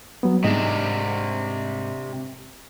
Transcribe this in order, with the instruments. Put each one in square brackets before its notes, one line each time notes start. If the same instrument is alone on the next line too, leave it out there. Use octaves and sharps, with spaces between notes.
[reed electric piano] F#3 G3 B3
[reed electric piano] G#2 G#3 D#5 [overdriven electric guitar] C3 D4